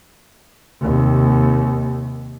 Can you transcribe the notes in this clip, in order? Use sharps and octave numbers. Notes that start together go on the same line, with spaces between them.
D#2 C3